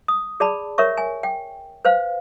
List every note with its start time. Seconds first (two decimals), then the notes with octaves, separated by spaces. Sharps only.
0.08 D#6
0.40 G#4 D5 A5 B5
0.78 A#4 C#5 E5 C#6
0.97 G#5
1.23 G5
1.85 B4 C5 F5